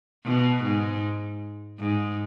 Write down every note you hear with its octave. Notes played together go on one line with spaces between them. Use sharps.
B2
G#2
G#2